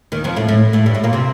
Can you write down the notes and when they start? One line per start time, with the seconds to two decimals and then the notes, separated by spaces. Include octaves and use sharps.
0.12 D#2 D#3
0.24 F2 F3
0.36 A2 A3
0.48 A2 A3
0.73 A2 A3
0.86 G2 G3
0.94 A2 A3
1.04 A#2 A#3
1.13 C3 C4